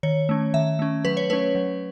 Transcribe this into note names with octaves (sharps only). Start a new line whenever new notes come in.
D#3 C#5
A3 C#4
D#3 E5
A3 C#4
F#3 B4
C#5
A3 C#4 B4
F#3